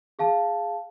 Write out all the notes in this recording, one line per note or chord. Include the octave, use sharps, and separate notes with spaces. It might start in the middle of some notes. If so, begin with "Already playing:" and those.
G#4 F5 A5